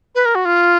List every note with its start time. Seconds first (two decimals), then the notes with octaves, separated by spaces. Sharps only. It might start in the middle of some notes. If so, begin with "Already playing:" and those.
0.15 B4
0.26 A#4
0.35 F#4
0.45 F4